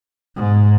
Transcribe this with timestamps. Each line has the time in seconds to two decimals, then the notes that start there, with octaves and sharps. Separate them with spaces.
0.36 G#2